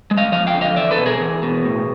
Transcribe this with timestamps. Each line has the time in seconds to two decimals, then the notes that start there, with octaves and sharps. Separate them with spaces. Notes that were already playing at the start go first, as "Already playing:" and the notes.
0.11 G#3
0.17 D#5 F5
0.32 F3 D#5 F5
0.47 F5 G5
0.54 D3
0.61 D#5 F5
0.76 E2 D5 E5
0.91 A4 B4
0.98 B2
1.06 G#4 A#4
1.20 E2
1.43 B2
1.65 A2